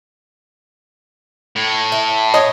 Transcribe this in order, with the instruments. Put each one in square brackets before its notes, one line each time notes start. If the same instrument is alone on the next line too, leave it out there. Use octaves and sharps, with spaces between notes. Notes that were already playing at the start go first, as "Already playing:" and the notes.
[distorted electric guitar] A2
[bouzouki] E5
[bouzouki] D#4 C#5 [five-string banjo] D#5